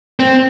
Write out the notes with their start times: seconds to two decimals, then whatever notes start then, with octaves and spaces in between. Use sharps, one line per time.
0.20 C4